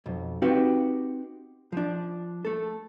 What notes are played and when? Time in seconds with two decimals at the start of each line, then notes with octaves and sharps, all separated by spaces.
0.06 B1 F2
0.42 C4 D#4 F#4 G4 B4 F5
1.72 F3 D4
2.45 A3 A4